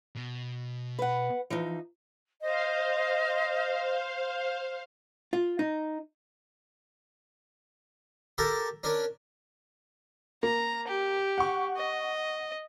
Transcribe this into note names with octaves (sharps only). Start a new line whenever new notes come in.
B2
B4 F#5
E3 F3 D#4
C5 D#5 F5
F4
D#4
G4 A4 A#4 A5 A#5
C#4 D4 A#4
A#3 A#5
G4
F#5 C#6
D#5